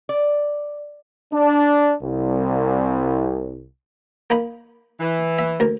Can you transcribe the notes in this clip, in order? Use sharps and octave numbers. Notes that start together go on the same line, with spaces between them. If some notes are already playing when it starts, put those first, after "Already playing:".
D5
D4
C2
A#3 D#4 B5
E3
E5
D2 A#4